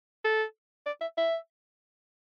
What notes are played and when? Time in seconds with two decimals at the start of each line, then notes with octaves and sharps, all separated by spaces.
0.25 A4
0.86 D5
1.01 E5
1.18 E5